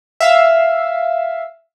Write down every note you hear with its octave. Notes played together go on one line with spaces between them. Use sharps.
E5 F5 E6